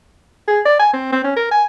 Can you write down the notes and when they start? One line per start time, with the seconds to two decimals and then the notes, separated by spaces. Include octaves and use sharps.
0.48 G#4
0.66 D5
0.80 G#5
0.93 C4
1.12 C4
1.24 C#4
1.37 A#4
1.51 G#5